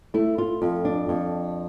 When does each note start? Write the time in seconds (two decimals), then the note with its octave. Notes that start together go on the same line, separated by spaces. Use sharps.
0.14 A3 E4
0.38 F4
0.62 F2
0.85 D4
1.09 F2